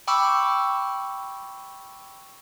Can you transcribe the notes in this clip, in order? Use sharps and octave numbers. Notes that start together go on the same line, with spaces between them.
G5 B5 C#6 D6 E6